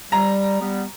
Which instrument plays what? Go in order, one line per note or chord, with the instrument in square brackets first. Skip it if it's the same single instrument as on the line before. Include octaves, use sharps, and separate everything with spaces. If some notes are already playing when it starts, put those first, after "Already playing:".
[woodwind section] G3 [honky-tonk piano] A#5
[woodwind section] G3 B3